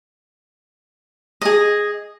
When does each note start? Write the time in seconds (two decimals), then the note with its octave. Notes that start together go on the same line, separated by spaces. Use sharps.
1.41 G#4 D#5